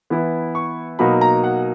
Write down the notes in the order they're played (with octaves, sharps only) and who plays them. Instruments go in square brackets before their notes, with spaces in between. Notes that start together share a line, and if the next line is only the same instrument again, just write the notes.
[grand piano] E3 B3 E4
C#6
B2 F#3 A#3 D#4 B5
A#5
F#5